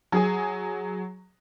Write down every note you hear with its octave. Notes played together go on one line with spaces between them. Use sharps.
F#3 G#4 G#5